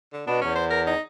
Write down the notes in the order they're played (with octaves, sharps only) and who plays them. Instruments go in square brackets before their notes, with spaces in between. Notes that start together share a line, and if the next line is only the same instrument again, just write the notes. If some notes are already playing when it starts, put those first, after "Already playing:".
[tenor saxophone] D3
[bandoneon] B2 B3 [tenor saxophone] D4
[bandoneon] E2 [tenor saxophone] C#4
[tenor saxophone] C5
A#4
D#4